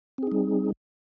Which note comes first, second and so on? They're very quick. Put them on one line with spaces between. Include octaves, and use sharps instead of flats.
C4 G#4 D#4 G3